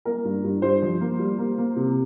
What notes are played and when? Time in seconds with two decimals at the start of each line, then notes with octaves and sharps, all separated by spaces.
0.05 A#3 A#4
0.25 G2
0.44 G2
0.62 G2 C5
0.82 F3
1.01 A#3
1.19 G3
1.38 A#3
1.58 A#3
1.76 C3